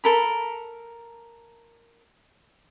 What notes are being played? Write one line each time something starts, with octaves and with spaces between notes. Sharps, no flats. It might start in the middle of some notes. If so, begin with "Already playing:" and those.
A4 A#4 B5